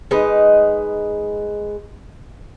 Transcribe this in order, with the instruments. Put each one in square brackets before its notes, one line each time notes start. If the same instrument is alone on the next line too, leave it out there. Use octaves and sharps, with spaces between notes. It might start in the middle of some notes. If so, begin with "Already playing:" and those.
[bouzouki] G#3 D#4 B4 D#5